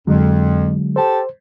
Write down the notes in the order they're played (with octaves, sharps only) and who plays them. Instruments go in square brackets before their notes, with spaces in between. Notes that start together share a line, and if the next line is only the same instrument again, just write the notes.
[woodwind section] F2 [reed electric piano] D3 F#3 G#3
[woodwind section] G4 A4 A5 [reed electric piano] C5